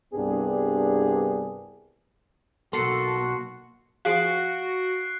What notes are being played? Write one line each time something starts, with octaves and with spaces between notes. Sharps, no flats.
C2 G2 B3 D4 G4 G#4
B1 A#3 F#4 A4 C6 C7 C#7
F3 F#4 G#4 F5 F#6 A6 C7 D7